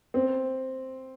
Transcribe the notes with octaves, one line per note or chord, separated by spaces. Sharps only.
C4